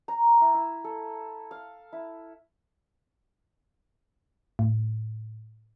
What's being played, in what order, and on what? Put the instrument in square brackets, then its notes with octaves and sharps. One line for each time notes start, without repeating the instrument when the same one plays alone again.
[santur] A#5
E4
E4
A4
F5
E4
[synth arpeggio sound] A2